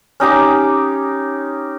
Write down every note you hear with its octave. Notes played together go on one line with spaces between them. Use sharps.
C#4 D#4 G4 D6